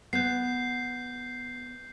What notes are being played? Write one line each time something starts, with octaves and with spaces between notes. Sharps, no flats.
B3 G6 C7